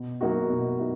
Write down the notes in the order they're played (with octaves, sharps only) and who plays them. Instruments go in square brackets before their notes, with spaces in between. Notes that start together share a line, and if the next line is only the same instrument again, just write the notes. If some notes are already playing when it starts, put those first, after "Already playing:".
Already playing: [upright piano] B2
F#3 A#3 D#4 F#4
B2
F#3 A#3 D#4